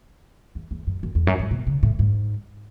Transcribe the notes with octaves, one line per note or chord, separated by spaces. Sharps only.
E2
E2
F#2
F#2
E2
F#2
G#2
B2
C#3
A2
G#2